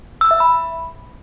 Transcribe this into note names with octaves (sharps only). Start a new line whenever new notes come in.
E6
E5
B5